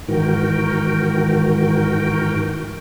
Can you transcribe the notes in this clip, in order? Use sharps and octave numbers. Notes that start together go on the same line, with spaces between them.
G#2 D#3 E3 F#4 A#4 G5